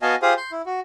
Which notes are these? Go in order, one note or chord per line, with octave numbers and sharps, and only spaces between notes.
B3 F#4 D#5 F5 G#5 A5
F4 G4 G#4 C5 F5 D#6
C6 G6
E4
F#4